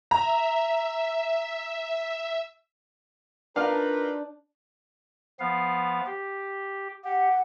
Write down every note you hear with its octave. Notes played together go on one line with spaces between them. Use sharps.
E5 A#5
D4 D#4 F4 A#4 B4 F5
F3 B3 F5
G4
G4 F#5